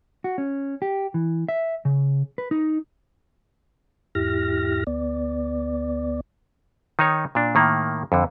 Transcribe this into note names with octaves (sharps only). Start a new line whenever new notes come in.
F#4
C#4
G4
E3
E5
C#3
B4
D#4
E2 G#2 E4 G4 F6 A#6
D2 B3 D5
D#3 D#4 C#5
A#2 D4
A2 D#3 A#3
F2 D3